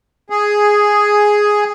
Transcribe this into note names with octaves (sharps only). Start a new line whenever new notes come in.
G#4